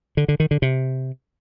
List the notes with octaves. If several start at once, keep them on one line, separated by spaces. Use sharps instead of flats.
D3
D3
D#3
D3
C3